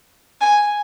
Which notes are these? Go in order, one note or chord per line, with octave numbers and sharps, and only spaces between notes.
G#5